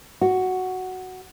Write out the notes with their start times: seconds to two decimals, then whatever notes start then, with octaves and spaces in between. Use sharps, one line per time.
0.21 F#4